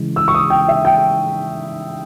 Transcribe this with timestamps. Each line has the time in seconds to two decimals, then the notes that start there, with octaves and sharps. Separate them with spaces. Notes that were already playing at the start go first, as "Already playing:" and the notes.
Already playing: C#3 E3 G#3
0.16 E6
0.28 C#6
0.35 D#6
0.50 G5
0.68 E5
0.85 G5